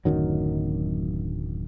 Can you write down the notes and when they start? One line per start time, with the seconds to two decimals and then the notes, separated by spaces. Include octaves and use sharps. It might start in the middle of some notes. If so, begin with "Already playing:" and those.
0.05 D1 F#2 D#3 F#3